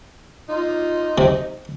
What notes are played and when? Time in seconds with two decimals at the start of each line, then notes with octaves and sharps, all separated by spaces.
0.49 D#4 F4
1.18 C3